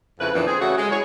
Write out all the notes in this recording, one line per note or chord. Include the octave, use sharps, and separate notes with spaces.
F2 C#3 E4 B4
F2 A#2 E3 B3 D4
C4 G#4
C#3 A3 F#4
G#3
E4 G#4 C#5